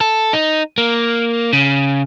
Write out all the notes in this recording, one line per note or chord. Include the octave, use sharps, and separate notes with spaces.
A4
D#4
A#3
C#3